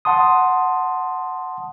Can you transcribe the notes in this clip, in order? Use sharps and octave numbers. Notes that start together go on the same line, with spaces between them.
F#5 A5 C6 D#6